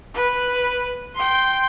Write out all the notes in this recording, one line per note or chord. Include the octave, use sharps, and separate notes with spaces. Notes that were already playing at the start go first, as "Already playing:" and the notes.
B4
G5 C6